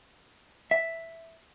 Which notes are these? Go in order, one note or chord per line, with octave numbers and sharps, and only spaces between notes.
E5